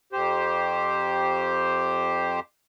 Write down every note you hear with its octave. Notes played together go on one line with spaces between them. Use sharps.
F2 G4 C5